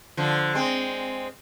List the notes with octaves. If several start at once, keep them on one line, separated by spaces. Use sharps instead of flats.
D3 F3
G#3 C4